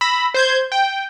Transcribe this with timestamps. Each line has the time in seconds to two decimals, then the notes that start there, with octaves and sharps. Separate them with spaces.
0.01 B5 E6 A#6
0.34 C5 G6 G#6
0.72 G5